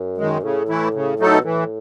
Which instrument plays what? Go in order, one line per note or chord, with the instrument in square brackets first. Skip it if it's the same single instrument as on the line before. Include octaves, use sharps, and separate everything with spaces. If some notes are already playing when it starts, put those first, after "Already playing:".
Already playing: [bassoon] F#2
[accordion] D#3 G#3
[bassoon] A2 [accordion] C#3
[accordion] E3 A3 E4
C#3
F#3 A3 D#4 A4
[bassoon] B2
[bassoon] A2 [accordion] E3